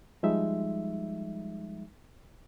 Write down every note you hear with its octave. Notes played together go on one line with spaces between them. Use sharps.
F3 G3 G#3 D#4 E5